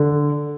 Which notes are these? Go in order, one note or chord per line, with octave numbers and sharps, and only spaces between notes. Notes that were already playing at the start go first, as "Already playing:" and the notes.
Already playing: D3